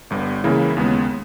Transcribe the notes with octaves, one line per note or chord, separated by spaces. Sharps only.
G1 G2 G3 B3
C#2 C#3 E3 A#3 E4
D#2 C#3 G#3 B3